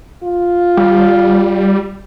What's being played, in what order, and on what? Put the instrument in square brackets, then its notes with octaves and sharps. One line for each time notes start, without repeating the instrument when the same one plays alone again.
[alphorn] F4
[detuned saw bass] G3